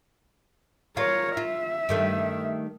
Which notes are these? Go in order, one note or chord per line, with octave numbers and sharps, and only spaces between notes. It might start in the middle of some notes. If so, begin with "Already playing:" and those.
F4 A#4 C#5
F4 E5
G2 D#3 A3